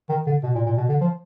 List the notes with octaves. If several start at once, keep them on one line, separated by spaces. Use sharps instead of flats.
D#3
D3
B2
A#2
A#2
B2
D3
F3